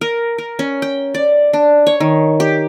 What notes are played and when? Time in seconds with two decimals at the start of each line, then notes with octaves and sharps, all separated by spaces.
0.01 A#4
0.38 A#4
0.59 C#4
0.82 G5
1.14 D5
1.53 D4
1.87 C#5
2.00 D#3
2.40 G4